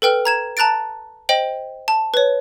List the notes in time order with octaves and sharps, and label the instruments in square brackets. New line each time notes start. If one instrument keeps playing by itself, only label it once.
[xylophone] A4 B4 G5 F6
A#5 G#6 E7
A5 A#5 F#6 A6 D7
C5 D#5 G5 F#7
A5
B4 C#5